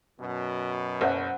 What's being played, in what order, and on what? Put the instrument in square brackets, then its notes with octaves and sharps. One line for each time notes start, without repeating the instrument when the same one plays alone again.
[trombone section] F#2 B2
[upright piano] F#1 [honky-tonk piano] C5 E5 F#5